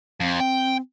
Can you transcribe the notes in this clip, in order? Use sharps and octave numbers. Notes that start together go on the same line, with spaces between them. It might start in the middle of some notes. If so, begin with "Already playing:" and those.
F2 C4
G5